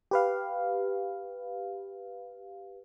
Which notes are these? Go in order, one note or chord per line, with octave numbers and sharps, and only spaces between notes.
G4 B4 F5